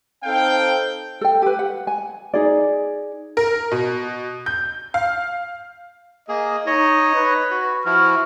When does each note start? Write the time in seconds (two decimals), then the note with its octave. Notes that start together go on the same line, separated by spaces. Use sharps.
0.24 C4 D#4 A4 C5 F5 G5
1.21 A4 G5
1.42 G4 B4
1.59 F#5
1.87 G#5
2.34 D#4 G#4 D5
3.37 A#4
3.72 B2
4.46 G6
4.94 F5
6.29 A#3 G#4 D#5
6.67 D#4 C#5 D#5
7.15 B4
7.51 F#4
7.85 F3 E4 F#4 F6